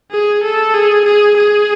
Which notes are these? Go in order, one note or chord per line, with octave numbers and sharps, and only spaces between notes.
G#4
A4
G#4
G#4
G#4